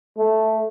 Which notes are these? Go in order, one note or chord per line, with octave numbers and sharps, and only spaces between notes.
A3